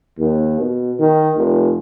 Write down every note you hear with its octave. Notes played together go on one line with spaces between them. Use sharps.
D#2
B2
D#3
F1